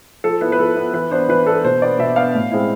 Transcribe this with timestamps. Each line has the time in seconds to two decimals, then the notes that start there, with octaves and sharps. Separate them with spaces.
0.24 F3 A4
0.41 B3 E4 B4
0.52 B4
0.59 F3 A4
0.76 B3 E4
0.94 E3 B4
1.11 B3 D4 C5
1.28 E3 B4
1.47 B3 D4 A4
1.64 B2 C5
1.82 B3 D4 D5
1.99 B2 E5
2.16 B3 D4 F5
2.34 A2
2.52 G#3 C4 E4